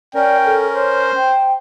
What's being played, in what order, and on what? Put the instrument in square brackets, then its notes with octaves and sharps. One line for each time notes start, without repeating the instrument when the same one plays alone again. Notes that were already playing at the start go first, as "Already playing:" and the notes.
[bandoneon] C#4 A#4 [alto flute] D5 [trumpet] G5
[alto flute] A4
[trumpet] C5 [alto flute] C#5
[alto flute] G5